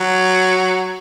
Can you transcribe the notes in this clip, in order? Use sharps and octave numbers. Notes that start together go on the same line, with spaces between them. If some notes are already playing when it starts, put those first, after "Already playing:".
Already playing: F#3